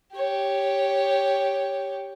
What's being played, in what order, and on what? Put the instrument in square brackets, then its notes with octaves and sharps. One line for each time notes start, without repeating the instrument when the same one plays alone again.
[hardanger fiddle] G4 C#5